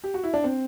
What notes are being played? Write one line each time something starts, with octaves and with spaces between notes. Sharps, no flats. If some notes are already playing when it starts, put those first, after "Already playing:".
G4
F#4
E4
D4
C4